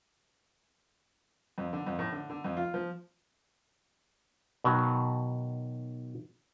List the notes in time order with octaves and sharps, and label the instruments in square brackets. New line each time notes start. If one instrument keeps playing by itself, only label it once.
[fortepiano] F2
D3
F2
A2
D3
D3
F2
F4
F3
[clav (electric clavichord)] B2 D#3 F#3